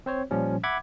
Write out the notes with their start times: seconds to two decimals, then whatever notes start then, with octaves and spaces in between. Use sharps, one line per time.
0.06 C4 C5 C#5
0.31 A#2 F3 G3 C#4
0.63 E5 F#5 B5 D6 G#6